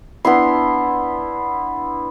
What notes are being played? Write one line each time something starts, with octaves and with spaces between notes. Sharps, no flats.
B3 D4 E4 C6